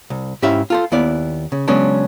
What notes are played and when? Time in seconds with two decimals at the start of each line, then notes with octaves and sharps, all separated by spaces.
0.10 C2
0.42 G#2 C#4 E4 G4 E5 F5
0.70 F4 A4 C5
0.92 D#2 B3 E4 D5 F5
1.52 C#3
1.68 C#3 F#3 G#3 B3 C#4 D4